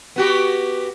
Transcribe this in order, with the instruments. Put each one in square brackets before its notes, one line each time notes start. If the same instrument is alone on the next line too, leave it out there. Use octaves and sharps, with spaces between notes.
[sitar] B3 F#4 G4